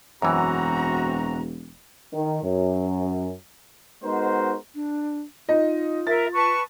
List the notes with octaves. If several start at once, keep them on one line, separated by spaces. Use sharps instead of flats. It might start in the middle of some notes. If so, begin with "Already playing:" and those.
E1 F#2 E3 C4 F#4 A#5
D#3
F#2
G#3 B3 D#4 F#4 A#4 C5
D4
D#4 F4 D#5
A#4 E5 A6
B4 A5 C#6